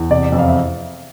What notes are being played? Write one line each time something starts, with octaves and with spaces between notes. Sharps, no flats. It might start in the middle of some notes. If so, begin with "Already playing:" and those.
Already playing: E2
C3 D5
F2
F5
E5